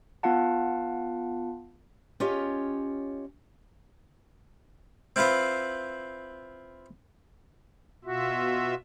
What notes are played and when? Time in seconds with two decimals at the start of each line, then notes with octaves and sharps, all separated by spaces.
0.23 B3 F4 F5 F#5 A5
2.20 C#4 F4 G4 C#5 D#5
5.16 C4 E4 F4 B4 C5
8.05 B2 F4 F#4 E5